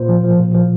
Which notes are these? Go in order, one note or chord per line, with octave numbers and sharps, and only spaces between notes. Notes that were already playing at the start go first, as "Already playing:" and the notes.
Already playing: A#2 C5
F3
F3
A#2
F3